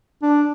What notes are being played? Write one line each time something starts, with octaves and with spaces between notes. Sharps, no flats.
D4